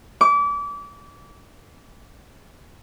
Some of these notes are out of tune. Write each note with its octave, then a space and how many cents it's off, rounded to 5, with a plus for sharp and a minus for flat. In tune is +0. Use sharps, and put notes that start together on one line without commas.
D6 -30